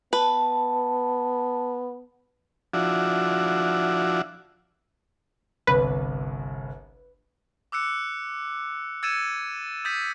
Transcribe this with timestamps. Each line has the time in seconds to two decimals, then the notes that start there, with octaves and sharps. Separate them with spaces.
0.13 B3 B4 A5
2.74 F3 D4 E4 F#4
5.67 G1 C2 B4
7.72 D6 E6 F#6 C#7
9.03 E6 G#6 A6 C#7 D#7 E7
9.85 D#6 G6 A6 B6 D#7